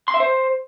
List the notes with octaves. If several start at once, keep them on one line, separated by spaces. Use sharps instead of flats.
C6
E5
C5